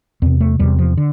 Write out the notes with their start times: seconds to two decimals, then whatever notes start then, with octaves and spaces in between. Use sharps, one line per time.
0.22 E2 C3 C4
0.41 A3
0.59 E2 C3 G3
0.79 F3
0.97 D3